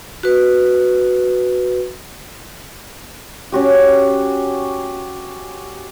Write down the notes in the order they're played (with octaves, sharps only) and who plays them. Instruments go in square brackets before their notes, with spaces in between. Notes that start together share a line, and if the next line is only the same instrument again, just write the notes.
[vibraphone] F#4 B4
[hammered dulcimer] C#4 F#4 G4